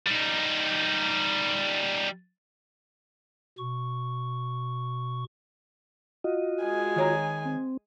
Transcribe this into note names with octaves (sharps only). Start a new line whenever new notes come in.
G3 D#4
B2 C#6
F4 F#4 D#5
G#3 G#5
D#3 C#5 A#5
C4